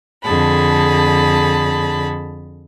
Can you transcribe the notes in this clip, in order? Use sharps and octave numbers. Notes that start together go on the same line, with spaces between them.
F2 D3 G#4 A5 B5